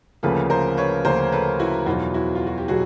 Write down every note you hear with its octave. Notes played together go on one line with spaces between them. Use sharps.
D2 C#3 F3 A#3 A4 B4
A#4 C5
B4 C#5
D2 C#3 F3 A#3 A#4 C5
A4 B4
E4 F#4
E2 B2 F#3 D#4 F4
E4 F#4
F4
F#4
G4
B2 F#3 F#4 G#4